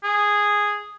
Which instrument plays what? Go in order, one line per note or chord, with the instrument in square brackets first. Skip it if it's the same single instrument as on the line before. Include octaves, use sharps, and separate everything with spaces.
[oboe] G#4